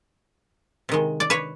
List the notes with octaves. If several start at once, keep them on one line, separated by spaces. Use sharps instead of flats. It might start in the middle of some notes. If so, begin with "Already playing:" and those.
C3 D#3 G#3
D5
B4 C#5